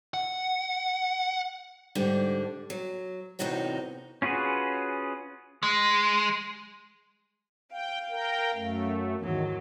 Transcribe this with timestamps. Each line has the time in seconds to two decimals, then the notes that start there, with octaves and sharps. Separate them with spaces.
0.14 F#5
1.95 G#2 D3 G3 D4
2.70 F#3
3.39 E2 A2 C3 D#4 F#4 C#5
4.22 C#4 F4 F#4 G#4 B4
5.63 G#3
7.71 F5 G5
8.10 A#4 G5
8.54 F#2 A3
9.20 E2 G#2 D#3 F#3